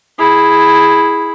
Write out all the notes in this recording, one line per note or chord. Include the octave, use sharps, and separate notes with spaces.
E4 G#4